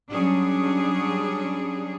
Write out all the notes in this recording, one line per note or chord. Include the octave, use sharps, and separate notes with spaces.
F#3 G3 C#4 D4 G#4